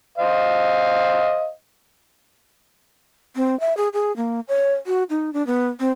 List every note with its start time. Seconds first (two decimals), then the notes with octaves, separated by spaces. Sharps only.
0.18 C5 D#5 F5
3.36 C4
3.60 E5
3.77 G#4
3.93 G#4
4.16 A#3
4.48 C#5
4.86 F#4
5.10 D#4
5.33 D4
5.47 B3
5.80 C4